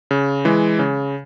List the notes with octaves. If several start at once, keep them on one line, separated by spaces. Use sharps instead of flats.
C#3
E3 G#3
C#3